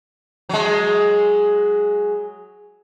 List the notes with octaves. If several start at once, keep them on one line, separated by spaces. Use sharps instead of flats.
F#3 G#3